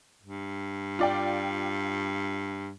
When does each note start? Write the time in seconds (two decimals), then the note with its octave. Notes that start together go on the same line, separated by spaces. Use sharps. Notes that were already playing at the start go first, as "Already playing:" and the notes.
0.22 G2
0.99 F4 D5 G5